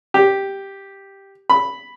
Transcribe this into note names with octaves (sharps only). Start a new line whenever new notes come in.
G4
B5